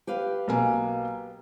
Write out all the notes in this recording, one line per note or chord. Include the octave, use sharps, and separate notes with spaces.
G4 B4 F5
B1 A#3 G#5